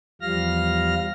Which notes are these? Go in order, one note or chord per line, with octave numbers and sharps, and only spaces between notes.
E2 F3 G3 F5 F6 A#6